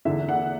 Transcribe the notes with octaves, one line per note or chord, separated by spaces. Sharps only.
E2 D3 E5
F#5